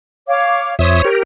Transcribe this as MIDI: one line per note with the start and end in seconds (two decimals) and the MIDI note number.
0.28 0.74 73
0.28 0.74 77
0.28 0.74 86
0.79 1.02 41
0.79 1.08 72
0.79 1.08 73
0.79 1.02 76
0.79 1.02 87
1.04 1.23 67
1.04 1.23 70